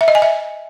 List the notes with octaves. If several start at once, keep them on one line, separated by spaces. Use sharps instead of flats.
E5
D#5
G#5
E5